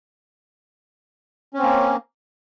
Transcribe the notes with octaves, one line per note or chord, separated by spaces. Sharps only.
A#3 C4 C#4